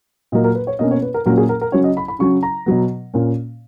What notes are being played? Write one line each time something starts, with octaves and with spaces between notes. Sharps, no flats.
A#2 F#3 A#3 D#5
A#4
B4
C#5
B2 A#3 C#4 D#5
C#5
B4
A#4
A#2 F#3 A#3 C#4 A#4
G#4
A#4
A#4
C#3 F#3 C#4 C#5
D#5
B5
B5
C#3 F#3 C#4 C#6
A#5
B2 F#3 B3
A#2 A#3 C#4